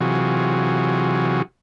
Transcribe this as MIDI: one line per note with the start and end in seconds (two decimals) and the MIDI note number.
0.01 1.42 48
0.01 1.42 52
0.01 1.42 54
0.01 1.42 65
0.01 1.42 66
0.01 1.42 68